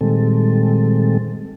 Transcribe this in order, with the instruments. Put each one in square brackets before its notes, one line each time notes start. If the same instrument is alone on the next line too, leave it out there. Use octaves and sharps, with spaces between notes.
[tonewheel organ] A#2 D#3 G3 G#3 C4 A4